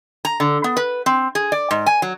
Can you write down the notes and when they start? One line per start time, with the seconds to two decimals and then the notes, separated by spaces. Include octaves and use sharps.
0.25 A#5
0.40 D3
0.64 B3
0.77 B4
1.06 C4
1.35 G#4
1.52 D5
1.71 G#2
1.86 G#5
2.02 F#3